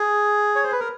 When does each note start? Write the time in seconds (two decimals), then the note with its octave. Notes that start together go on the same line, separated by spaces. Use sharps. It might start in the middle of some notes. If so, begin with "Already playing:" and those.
Already playing: G#4
0.56 C#5
0.63 C5
0.72 B4
0.80 A#4